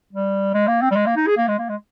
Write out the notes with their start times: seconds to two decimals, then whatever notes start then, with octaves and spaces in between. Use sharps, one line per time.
0.13 G3
0.54 G#3
0.67 A#3
0.82 C4
0.91 G3
0.96 G#3
1.06 A#3
1.16 D#4
1.27 G#4
1.38 A#3
1.48 G#3
1.58 A#3
1.69 G#3